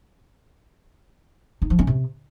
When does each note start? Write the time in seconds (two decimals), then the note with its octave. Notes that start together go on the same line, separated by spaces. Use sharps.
1.62 D#4
1.70 F3
1.79 C#4
1.87 C3